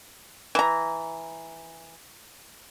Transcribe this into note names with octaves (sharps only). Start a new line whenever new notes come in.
E3 A#5